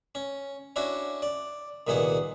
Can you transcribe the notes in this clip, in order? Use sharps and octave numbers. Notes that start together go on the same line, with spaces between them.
C#4
C#4 D4 E4 F#4
D5
C2 A#2 D#3 B3 G#4 F#5